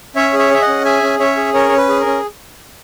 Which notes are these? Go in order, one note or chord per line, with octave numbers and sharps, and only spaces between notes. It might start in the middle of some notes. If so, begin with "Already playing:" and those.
C#4 C#5 E5
G#4
C#5 E5
G#4 E5
D#5 F#5
C#4
G#4 E5 G#5
C#4
C#4 C#5 E5
G#4
C#4 A#4 C#5
C#4 C#5
B4
G#4
A#4
C#4